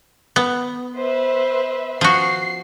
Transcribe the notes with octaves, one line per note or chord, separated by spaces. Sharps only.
B3
B4 C5 E5
F3 F#4 C7